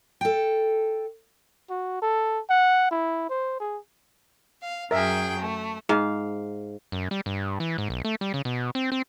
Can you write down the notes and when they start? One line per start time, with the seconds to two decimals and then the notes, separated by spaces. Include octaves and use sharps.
0.21 A4 G5
1.70 F#4
2.02 A4
2.49 F#5
2.91 E4
3.29 C5
3.60 G#4
4.62 F5
4.91 F#2 G#4 A#4 E5 G5
5.39 A3
5.89 G#2 F5
6.92 F#2
7.11 G3
7.26 G2
7.60 E3
7.78 G#2
7.90 B1
8.05 A3
8.21 G3
8.34 C#3
8.45 B2
8.75 C4
8.92 C4